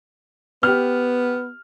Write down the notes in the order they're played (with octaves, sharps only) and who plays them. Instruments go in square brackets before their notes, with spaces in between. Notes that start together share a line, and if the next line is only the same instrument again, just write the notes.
[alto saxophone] B3 [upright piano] G4 F6